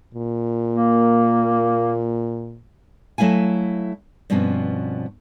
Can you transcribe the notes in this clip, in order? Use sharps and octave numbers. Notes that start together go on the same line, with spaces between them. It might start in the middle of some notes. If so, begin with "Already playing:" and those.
A#2
A#3
F#3 A3 E4 F5 G#5
G2 B2 F3 C4 C#4